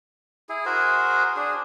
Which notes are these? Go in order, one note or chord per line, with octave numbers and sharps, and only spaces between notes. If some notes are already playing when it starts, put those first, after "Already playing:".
E4 G#4
F#4 G#4 A#4 C5
D4 G#4